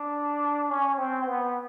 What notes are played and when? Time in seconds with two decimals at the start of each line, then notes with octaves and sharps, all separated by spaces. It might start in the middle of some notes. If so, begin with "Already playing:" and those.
Already playing: D4
0.70 C#4
0.98 C4
1.27 B3